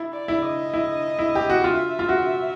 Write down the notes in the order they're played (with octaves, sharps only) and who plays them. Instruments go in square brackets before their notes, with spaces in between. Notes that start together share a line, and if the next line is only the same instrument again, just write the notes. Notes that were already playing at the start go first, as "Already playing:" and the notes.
Already playing: [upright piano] E4
[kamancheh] D5
[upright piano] E4
[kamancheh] D#5
[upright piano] E4
E4
G4
F#4
[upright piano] F4 [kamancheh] E5
[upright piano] F4
F#4